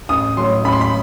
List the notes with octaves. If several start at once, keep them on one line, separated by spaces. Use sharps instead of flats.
A1 D#6
A2 F#3 C6
A1 B5
C6
B5